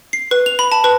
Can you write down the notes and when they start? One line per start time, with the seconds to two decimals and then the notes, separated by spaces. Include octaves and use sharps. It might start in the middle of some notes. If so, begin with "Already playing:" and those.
0.13 C7
0.31 B4
0.46 F7
0.59 B5
0.72 A5
0.84 B4